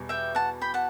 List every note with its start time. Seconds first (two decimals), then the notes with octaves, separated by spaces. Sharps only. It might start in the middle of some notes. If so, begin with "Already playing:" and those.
Already playing: E2 B2 G3
0.09 E5 G5
0.35 F#5 A5
0.61 G5 B5
0.74 F#5 A5